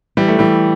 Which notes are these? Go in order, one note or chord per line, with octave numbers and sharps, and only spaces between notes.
E3 G3
A3
E3 G3